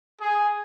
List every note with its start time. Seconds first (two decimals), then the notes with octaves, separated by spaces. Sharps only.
0.19 G#4